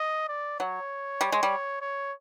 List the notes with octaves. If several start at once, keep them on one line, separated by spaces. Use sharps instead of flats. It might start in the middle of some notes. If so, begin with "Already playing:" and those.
Already playing: D#5
D5
F#3 C#5
G3
G#3
G3
C#5